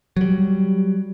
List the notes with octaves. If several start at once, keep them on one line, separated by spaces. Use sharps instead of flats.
F#3 G3